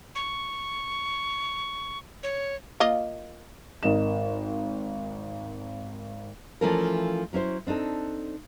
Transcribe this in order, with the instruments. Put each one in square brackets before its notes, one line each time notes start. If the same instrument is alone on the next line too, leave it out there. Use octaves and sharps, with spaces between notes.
[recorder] C#6
C#5
[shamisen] A#3 F4 D#5
[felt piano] G#1 A#4 D#5 E7
[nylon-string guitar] E3 F3 A3 C#4 A4 A#4
F#3 C#4 E4 C5
C4 D4 D#4 A4